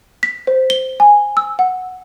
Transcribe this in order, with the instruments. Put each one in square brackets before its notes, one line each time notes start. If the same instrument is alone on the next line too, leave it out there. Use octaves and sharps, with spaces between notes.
[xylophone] B6
C5
G7
G#5
E6
F#5